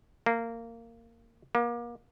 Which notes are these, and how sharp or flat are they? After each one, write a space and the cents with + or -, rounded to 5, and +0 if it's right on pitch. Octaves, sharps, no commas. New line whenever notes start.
A#3 -15
A#3 +35